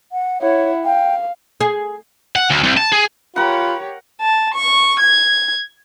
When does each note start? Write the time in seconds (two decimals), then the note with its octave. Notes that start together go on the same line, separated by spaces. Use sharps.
0.12 F#5
0.42 E4 C#5 F#5
0.85 F5 G5
1.61 G#4
2.36 F#5
2.50 D2
2.63 C2
2.77 A5
2.92 G#4
3.36 F4 G4 A#4 C#5 F#5 B5
4.21 A5
4.54 C#6
5.00 G#6